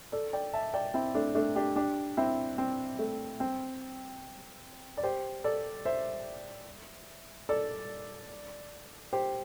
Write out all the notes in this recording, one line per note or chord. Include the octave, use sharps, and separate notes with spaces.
A4 D5
D5 G5
E5 A5
D5 G5
C4 E4
A3 D4
A3 D4
D4 G4
D4 G4
C4 E4
C4
A3
C4
D5
G4 C5
A4 D5
C5 E5
A4 D5
G4 C5